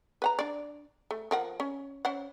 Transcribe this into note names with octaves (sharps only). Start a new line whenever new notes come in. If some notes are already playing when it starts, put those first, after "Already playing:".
B4 F#5 A#5
D4 D5
A3
F3 A#4 F#5
C#4
C#4 C5 F#5